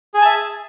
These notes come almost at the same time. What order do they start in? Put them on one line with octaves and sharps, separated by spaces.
G#4 G#5 A5 E5